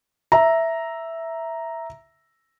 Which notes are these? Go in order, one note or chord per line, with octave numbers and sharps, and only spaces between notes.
E5 A#5